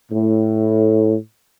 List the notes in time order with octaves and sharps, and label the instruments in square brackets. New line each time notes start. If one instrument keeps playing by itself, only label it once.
[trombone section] A2